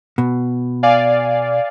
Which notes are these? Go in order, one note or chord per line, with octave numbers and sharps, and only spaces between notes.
B2
D5 F5 G#5